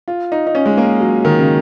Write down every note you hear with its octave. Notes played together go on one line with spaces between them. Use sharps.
F4
D#4
D#4
C#4
G#3
A#3
F#3
D#3
C#3